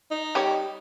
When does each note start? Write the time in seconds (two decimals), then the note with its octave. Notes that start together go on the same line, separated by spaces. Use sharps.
0.11 D#4
0.35 G3 G4 C#5